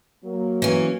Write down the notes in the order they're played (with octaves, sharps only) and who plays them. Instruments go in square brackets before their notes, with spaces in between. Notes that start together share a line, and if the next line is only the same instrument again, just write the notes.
[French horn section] F#3 A#3
[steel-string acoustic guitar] E3 C#4